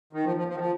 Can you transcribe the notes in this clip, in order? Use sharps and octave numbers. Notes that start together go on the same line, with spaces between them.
D#3
F3
F3
F3
D#3
F3